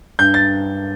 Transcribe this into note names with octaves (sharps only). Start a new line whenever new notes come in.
G2 G6
A6